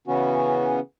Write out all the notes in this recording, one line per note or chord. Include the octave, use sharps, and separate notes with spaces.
C#3 E3 B3 C#4 F#4